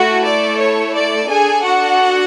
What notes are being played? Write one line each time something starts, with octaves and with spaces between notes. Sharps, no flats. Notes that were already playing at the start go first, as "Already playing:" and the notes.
Already playing: A3 E4 F#4 A4
D5
C#5
D5
D4 G#4 A4 G#5
F#4 F#5